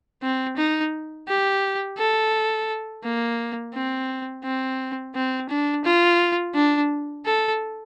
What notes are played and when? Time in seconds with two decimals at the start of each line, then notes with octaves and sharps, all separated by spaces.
0.22 C4
0.57 D#4
1.28 G4
1.98 A4
3.03 A#3
3.74 C4
4.44 C4
5.15 C4
5.49 D4
5.84 F4
6.55 D4
7.25 A4